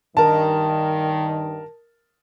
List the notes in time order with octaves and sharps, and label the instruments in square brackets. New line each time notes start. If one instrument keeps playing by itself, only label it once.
[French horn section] G2 D#3 [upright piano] A#4 A5